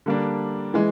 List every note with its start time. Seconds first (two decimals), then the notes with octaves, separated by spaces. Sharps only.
0.06 D3 G3 A#3 D4
0.74 E3 G#3